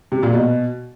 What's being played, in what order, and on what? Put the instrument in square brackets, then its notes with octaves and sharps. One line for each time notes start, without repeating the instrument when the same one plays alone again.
[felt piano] C3
A#2
B2